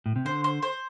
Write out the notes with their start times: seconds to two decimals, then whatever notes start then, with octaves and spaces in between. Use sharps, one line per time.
0.06 A2
0.16 C3
0.25 D3 C5
0.44 C5
0.62 C5